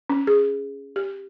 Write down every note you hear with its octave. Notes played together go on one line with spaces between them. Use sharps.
C#4
G#4
G4